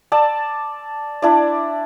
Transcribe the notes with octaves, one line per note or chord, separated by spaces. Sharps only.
D5 A5 E6
D4 E4 D5